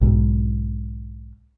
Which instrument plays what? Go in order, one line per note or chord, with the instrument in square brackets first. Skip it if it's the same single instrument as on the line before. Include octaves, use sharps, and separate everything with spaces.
[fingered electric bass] B1 G#2